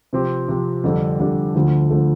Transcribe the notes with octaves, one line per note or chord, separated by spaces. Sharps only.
C3 F3 C4 G4
C3 F3 C4 G4
F2 D3 G3 D4 A4
F2 D3 G3 D4 A4
D2 D3 F3 A3
D3 F3 A3